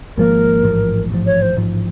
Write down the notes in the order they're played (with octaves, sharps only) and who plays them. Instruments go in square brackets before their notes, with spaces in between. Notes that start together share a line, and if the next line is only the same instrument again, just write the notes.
[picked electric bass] G#1 G#2 F3 A#3 [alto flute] A#4
[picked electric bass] A1 G#2 F3
A1 G#2 F3
[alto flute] C#5
C5
[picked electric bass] A1 G#2 F3